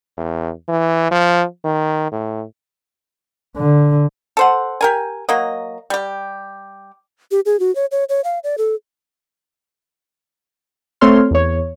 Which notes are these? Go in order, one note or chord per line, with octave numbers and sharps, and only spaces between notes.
E2
E3
F3
D#3
A2
D3
A4 C5 F#5
G4 A#4 G#5
F#3 A#3 D#5
G3 G4
G4
G#4
F#4
C#5
C#5
C#5
F5
D5
A4
A3 C4 A4 C#5 C6 F6
E2 C#5